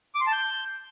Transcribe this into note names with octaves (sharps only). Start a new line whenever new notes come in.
D6
C6
A5
G6